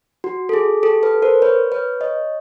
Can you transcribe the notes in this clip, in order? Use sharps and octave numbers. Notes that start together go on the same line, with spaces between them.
F#4
A4
G#4
G4 A4
A4 B4
A#4 C5
B4 C#5
B4 C#5
C#5 D#5